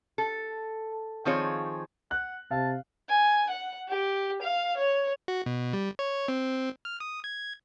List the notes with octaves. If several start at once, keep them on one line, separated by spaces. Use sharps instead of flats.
A4
D#3 F3 C4 F4 G#4 C#5
F#5 F#6
C3 F5 A5
G#5
F#5
G4
F5
C#5
F#4
B2
G3
C#5
C4
F6
D#6
G#6